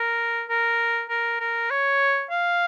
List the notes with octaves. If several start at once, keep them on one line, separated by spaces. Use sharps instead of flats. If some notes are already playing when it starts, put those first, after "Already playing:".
Already playing: A#4
A#4
A#4
A#4
C#5
F5